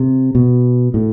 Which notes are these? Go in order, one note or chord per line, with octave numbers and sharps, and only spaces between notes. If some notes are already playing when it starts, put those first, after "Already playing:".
Already playing: C3
B2
A2